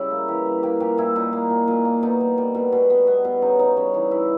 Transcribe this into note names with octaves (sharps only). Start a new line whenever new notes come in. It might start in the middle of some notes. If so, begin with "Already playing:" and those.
Already playing: C#3 G3 E4
A#3
E3 G4
G3
A#3 G4
A#2 G4
A#2 E4
A#2 D#4
A#3
A#2
A#2
A#3
B2 D#4
G3
G3
B2
B2
B3
B3
B2
C#3 D#4
C#3 D#4
G3 C#4
E3 D#4
E3 E4